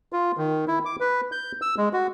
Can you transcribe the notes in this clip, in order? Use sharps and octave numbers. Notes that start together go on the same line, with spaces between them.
F4
D#3
E4
D6
B4
G6
E6
G#3
F#4